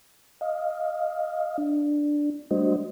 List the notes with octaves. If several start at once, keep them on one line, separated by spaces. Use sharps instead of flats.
D#5 F5
D4
G3 A3 D4 F#4 C5 D#5